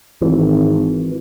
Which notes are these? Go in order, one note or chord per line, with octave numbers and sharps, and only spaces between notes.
G#1 E3